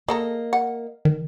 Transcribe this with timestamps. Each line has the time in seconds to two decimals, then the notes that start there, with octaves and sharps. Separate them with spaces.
0.08 A#3 G#4 A4 D#5 A#5
0.53 F#5
1.05 D#3